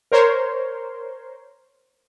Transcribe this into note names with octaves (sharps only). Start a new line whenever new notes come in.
A#4 C5 C#5 C6